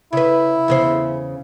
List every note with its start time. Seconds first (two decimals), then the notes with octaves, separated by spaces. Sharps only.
0.13 C#3 E4 B4
0.68 E2 C#3 C5